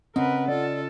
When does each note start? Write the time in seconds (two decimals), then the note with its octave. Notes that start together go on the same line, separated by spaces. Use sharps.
0.16 C#3 C4 C#4 A#4 B4 D#5 F#5
0.48 F4 A4 D5